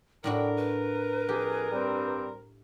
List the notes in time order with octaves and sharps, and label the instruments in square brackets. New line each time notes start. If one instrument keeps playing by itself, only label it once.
[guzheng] A2 D4 F#4 [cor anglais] A#4 [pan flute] G5
[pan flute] B4
[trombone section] F2 G#4 [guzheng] G4
[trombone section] G2 G3 C4